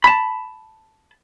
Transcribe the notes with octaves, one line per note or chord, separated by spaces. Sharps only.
A5 B5